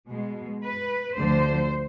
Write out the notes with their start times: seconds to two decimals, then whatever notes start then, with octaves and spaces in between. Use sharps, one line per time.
0.08 B2 G#3
0.63 B4
1.17 D2 D3 F3 C5